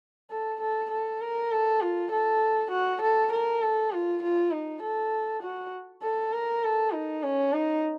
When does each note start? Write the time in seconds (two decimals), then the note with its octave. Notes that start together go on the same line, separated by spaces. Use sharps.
0.30 A4
0.60 A4
0.91 A4
1.21 A#4
1.51 A4
1.81 F4
2.11 A4
2.71 F#4
3.01 A4
3.32 A#4
3.62 A4
3.92 F4
4.22 F4
4.52 D#4
4.82 A4
5.43 F#4
6.03 A4
6.33 A#4
6.64 A4
6.93 D#4
7.23 C#4
7.53 D#4